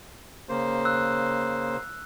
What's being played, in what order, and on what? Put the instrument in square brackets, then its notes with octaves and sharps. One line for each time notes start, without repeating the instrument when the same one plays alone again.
[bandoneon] C#3 A#3 C5
[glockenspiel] E6 F#6